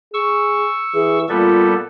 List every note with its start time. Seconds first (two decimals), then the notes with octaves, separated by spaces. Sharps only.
0.14 G#4 C#6 E6
0.94 E3 G#4
1.29 A#2 G3 B3 F4 A4